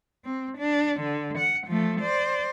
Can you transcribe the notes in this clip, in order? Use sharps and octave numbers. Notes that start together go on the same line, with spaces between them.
C4
D4
D3
F#5
F3 A3
C5 D5